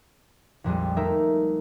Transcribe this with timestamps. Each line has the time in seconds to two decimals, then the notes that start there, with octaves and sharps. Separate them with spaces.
0.64 A#1 F2 G3 G#3
0.97 A3 A#3 D#4 A#4 E5